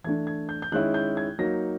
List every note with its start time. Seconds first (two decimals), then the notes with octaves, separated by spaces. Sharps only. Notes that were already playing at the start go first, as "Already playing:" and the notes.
0.04 E3 A3 D4 G#6
0.27 G#6
0.49 G6
0.62 G6
0.72 D#3 G#3 C#4 E4 F#6
0.94 G6
1.17 G#6
1.39 F#3 A#3 D#4 A#6